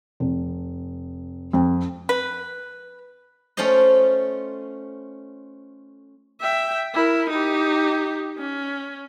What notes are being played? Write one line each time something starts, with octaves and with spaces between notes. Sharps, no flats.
F1
F2
B4
A3 C#4 F4 C5 D#5
E5 G5
E4 A#4
D#4 G4
C#4